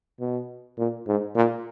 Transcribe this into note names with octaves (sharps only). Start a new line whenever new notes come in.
B2
A#2
G#2
A#2